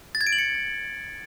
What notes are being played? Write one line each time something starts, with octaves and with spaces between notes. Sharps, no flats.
A6
G#6
D7
F#7
C#7